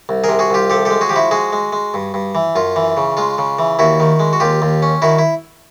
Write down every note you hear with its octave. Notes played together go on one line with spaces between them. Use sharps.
C2
C3 G#4 A#4
F#4 G#4
C2 F4 G4
F3 G4 A4
G#3 G4 A4
F#4 G#4
F3 G4
E4 F#4
G#3 F#4 G#4
G#3
G#3
G2
G2
E3
F#2 F4
E3
C#3
G#3 F4
C#3
E3
D#2 E4 F#4
D#3
G#3
F#4
D#2 F4 G4
D#2
C#4
D#3 E4 F#4
E4